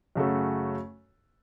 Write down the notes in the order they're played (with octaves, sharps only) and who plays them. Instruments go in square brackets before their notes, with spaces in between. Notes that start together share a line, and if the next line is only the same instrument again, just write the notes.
[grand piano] F#2 C#3 A3 F#4 A4